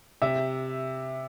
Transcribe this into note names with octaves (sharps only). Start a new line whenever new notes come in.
C3 E5